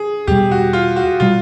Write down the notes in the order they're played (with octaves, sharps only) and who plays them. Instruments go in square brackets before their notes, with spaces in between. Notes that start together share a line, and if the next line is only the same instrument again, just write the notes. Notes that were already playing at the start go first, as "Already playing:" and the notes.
Already playing: [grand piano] G#4
[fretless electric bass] E2 B2 G3 [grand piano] G4
[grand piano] F#4
F4
F#4
[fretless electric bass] B2 G3 [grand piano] F4